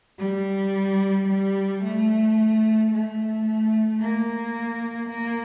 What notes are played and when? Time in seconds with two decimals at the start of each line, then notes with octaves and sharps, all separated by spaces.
0.19 G3
1.28 G3
1.83 A3
2.92 A3
4.01 A#3
5.09 A#3